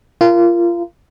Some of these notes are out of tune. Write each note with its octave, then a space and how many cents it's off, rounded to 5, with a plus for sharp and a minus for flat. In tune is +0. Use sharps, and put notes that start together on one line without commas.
F4 -25 A#4 +0